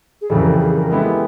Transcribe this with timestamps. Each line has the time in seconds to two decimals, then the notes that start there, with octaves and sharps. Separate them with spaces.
0.21 G#4
0.30 F2 C#3 E3 G3 A4
0.39 A#4
0.50 A4
0.59 G#4
0.76 A#4
0.90 G#3 B3 E4 G4 A4